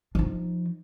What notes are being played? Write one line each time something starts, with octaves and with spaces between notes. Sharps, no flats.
F3 D#4